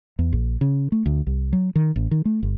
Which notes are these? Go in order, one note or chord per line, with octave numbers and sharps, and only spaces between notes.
E2
A#1
C#3
A3
D2
C2
F#3
D#3
A1
D#3
A3
G1